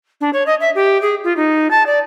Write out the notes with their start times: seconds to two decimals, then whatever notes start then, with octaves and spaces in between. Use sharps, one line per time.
0.21 D4
0.33 C#5
0.46 D#5
0.60 E5
0.75 G4
1.02 G#4
1.24 F4
1.36 D#4
1.71 A5
1.86 D5